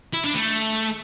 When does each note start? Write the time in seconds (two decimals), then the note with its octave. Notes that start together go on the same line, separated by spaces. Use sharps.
0.14 E4
0.24 D4
0.35 A3